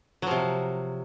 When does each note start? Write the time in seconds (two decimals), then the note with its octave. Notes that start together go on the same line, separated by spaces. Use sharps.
0.22 F#3
0.27 F3
0.31 C3